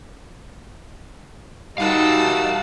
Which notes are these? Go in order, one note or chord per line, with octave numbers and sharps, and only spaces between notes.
G3 D#4 F#4 A#4 F5 F#5 A5 E6